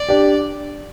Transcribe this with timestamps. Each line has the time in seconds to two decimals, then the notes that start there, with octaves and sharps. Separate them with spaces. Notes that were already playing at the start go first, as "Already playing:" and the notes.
Already playing: D5
0.09 D4 G4